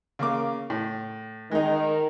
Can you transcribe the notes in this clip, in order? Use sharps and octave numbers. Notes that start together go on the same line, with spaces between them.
C#3 A#3 D6
A2
D#3 G#3 D#4